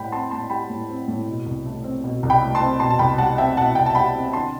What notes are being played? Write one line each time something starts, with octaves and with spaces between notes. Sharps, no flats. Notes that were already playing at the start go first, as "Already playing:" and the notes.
Already playing: A2 G3 F#5 G5 B5
C4 A5 C6
A2 A5 C6
G3 G5 B5
A2
C4
A2
B2
C2
A3
C4
B2
C2
G5 B5
A3
A5 C6
C4
B2 A5 C6
A5
C2 G5 B5
G3 F#5 A5
C4 E5 G5
B2 F#5 A5
C2 G5
A5
G3 G5 B5
C4
D3 A5 C6